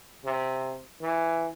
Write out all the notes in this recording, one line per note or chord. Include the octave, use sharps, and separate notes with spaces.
C3
E3